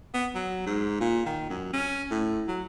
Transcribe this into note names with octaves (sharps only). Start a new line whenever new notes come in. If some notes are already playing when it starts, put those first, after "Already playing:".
B3
F#3
G#2
A#2
D#3
F#2
C#4
A2
F#3